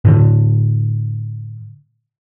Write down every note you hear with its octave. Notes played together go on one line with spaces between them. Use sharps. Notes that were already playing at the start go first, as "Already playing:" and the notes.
A2 D3